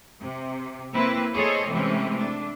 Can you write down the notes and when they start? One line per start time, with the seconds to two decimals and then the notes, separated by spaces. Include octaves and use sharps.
0.20 C3
0.93 A#3 C4 E4 B4
1.33 A3 G#4 A4 C5 C#5 D#5
1.69 C3 E3 G#3 A3 C4 C#4
2.14 A3 D4